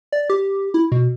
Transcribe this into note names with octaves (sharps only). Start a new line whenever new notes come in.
D5
G4
E4
B2